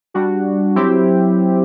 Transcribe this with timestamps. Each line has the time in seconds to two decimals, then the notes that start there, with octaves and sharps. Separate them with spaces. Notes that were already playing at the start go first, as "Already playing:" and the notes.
0.14 G3 D4 F#4
0.75 F#3 C4 E4 G4